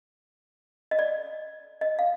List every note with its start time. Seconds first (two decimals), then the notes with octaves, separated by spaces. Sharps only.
0.91 D#5
0.99 D5
1.81 D#5
1.99 F5